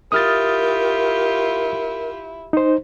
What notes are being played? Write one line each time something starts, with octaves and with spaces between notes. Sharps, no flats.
E4 F4 G4 A#4 D#6 F6 A6
D#4 C5